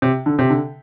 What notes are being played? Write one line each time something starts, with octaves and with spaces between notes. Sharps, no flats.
C3
D3
C3
D3